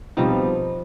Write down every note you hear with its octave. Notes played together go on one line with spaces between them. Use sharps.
B2 F3 G3 C4 D#4